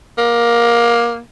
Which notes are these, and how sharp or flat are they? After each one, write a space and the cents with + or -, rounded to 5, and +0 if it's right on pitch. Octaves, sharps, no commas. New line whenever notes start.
A#3 +15